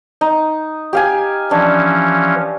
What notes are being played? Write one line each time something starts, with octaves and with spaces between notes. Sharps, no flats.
D#4
G4 F5 G#5
E3 F3 C#4 D4